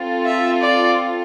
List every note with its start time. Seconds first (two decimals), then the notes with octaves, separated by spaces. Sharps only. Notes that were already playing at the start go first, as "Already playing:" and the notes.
Already playing: C4 F4 A4
0.25 E5
0.61 D5